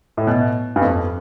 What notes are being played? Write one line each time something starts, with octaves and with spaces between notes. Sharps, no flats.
A2
B2
G2
F2